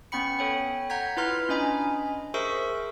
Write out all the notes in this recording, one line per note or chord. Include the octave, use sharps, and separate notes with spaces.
B3 C#4 G5 B5 C#7
A4 C#5 G5
F#5 A#5 G6 G#6 B6
E4 F4 B4 A#5 C6 F6
C#4 D4 D#5 G#5 B5
G#4 A#4 C5 E5 C#6 E6